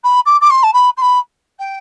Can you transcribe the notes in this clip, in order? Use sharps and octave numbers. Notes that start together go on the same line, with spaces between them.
B5
D6
D6
C6
A5
B5
C6
B5
G5